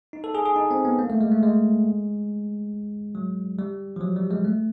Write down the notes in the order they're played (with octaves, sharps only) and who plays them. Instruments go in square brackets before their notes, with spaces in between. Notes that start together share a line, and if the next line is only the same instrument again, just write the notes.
[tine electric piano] D#4
A4
G#4
G#4
D#4
C4
B3
A#3
A3
G#3
A3
G#3
F#3
G3
F3
F#3
G3
G#3
A3